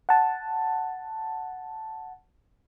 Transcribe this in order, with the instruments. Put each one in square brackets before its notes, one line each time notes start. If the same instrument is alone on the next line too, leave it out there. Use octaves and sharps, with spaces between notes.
[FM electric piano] F#5 A5